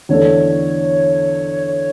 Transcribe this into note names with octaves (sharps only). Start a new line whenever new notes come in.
E2 D3 A3 D4 A4 C#5
C#5